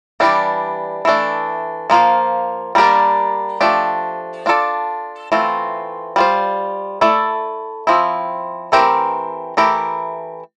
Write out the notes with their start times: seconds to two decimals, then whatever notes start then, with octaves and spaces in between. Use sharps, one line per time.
0.20 E3 G3 D4 G4
1.05 E3 A3 D4
1.90 F3 A#3 F4 C5
2.75 G3 A#3 D4 G4 A#4
3.61 F3 A3 D4 G4
4.46 D4 F4 A4 D5
5.32 E3 A3 C4 F4
6.16 G3 D4 F4 C5
7.01 A3 E4 A4 D5
7.87 F3 C4 E4
8.72 E3 A3 C4 G4 A#4
9.57 E3 A3 E4 G4 A#4